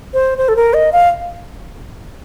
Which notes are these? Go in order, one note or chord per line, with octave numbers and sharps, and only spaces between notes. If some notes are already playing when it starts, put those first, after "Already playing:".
C5
C5
A4
A#4
D#5
F5